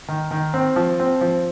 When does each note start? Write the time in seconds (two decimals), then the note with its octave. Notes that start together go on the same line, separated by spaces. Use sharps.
0.08 D#3
0.31 D#3
0.54 C4
0.76 F3
1.00 C4
1.21 F3